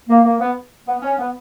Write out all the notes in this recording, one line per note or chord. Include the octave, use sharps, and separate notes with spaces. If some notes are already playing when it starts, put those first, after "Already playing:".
A#3
A#3
B3
B3
C#4
B3